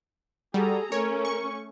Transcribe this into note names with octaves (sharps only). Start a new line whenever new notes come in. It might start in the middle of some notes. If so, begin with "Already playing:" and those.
G3 F#4 G#4 A4 A#5
A3 C#4 A#4 C#5
C#6